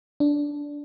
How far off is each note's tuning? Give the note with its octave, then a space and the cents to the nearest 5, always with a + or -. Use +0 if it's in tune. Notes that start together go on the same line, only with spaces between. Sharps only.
D4 -10